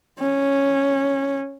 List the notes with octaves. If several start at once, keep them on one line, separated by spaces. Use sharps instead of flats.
C#4